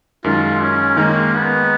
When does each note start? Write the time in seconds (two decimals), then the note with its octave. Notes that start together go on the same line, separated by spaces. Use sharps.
0.24 F#2 D#3 G#3 D#4 F4
0.61 C#4
0.97 D#3 G#3 A#3 D#4
1.34 B3